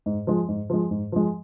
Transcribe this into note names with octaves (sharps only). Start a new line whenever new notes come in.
G#2
F3 G#3
G#2
F3 G#3
G#2
F3 G#3